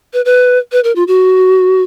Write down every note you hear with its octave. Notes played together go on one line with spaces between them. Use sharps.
B4
B4
B4
A#4
F4
F#4